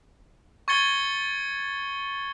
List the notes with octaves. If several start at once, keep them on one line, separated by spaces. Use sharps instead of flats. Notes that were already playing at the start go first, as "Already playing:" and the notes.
C#6 G#6 A6 C#7 G7